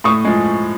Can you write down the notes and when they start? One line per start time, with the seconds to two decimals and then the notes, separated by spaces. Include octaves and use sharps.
0.04 A2 C#6 D#6
0.25 F3 G#3